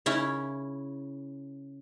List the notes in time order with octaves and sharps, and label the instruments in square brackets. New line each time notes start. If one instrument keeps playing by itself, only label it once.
[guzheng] C#3 C#4 E4